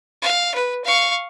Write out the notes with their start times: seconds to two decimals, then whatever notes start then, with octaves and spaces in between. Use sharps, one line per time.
0.22 F5
0.54 B4
0.85 F5 C#6